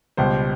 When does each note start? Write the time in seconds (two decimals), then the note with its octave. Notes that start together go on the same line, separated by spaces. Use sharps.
0.17 C#2 B2 G3 C5